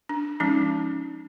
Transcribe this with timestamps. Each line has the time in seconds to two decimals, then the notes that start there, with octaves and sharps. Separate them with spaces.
0.09 D4
0.40 F3 G#3 C#4 D#4